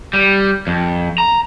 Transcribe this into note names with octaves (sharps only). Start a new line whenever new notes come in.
G3
F2
A#5